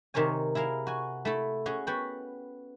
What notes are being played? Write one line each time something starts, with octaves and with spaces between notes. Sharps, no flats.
C3 D#3 A#4 C#5 G#5
E4 G#4 A#4 F5
F#4 G#5
A3 E4 A4
C#4 F#4 G#4
B3 F#4 F#5 G5 B5